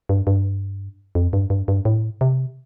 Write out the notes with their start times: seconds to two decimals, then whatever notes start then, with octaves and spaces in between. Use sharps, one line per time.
0.09 G2
0.27 G2
1.15 F2
1.33 G2
1.50 G2
1.68 G2
1.85 A2
2.21 C3